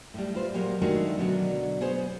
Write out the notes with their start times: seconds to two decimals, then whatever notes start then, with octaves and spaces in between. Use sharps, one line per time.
0.14 A2 G3
0.35 F4 B4 C5
0.54 A#2 F#3 G#3 A#3 G4
0.82 D#3 G#3 A3 D4 F#4 A#4
1.19 B2 D3 F#3 D4 F#4
1.81 B3 G#4 C5 C#5